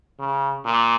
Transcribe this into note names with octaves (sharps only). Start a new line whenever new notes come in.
C#3
A#2